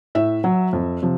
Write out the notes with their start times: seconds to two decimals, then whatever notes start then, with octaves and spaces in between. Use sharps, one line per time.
0.15 A2 E5
0.44 F#3
0.73 F2
1.02 C3 F3